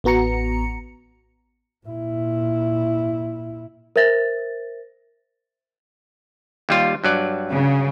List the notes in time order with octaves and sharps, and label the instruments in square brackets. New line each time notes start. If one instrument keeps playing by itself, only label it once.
[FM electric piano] A1 B3 F#4 A#5 C#7
[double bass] A#2 E4
[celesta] A#4 C5 E5 A6 A#6
[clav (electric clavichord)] D#2 G3 F4
G2 F#3 D5
[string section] C#3